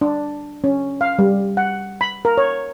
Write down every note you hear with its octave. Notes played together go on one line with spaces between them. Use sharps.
D4
C#4
F5
G3
F#5
B5
A#4
C#5